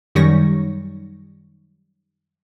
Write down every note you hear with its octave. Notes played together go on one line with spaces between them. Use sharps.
F#2 D#3 G3 C#5 C#6 A#6